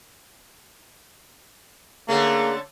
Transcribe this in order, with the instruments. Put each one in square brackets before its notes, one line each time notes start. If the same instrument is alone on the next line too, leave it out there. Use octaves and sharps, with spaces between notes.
[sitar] D3 A3 C#4 [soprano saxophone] A#3 [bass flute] G#4